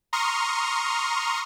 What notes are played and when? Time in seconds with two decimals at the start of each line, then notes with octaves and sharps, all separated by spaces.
0.13 A#5 C6 C#6 D#6 F6